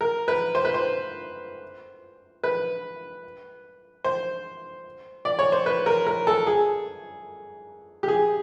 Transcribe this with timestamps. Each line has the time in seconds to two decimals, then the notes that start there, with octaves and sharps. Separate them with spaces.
0.01 A#4
0.28 B4
0.55 C5
0.65 B4
0.74 C5
2.44 B4
4.04 C5
5.25 D5
5.39 C#5
5.52 C5
5.66 B4
5.86 A#4
6.07 A#4
6.27 A4
6.47 G#4
8.03 G4
8.08 G#4